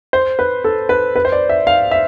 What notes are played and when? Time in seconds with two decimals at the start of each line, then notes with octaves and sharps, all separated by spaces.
0.13 C5
0.39 B4
0.64 A4
0.89 B4
1.16 B4
1.25 C5
1.32 D5
1.49 E5
1.67 F5
1.91 E5